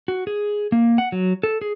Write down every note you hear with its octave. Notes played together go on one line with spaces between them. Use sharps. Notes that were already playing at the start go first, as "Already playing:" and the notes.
F#4
G#4
A#3
F#5
F#3
A4
G#4